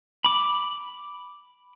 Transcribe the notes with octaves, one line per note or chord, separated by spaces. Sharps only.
B5 D6